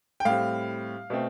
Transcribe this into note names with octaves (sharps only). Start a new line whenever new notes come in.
G5
A2 G3 C4 F5
B2 A3 C4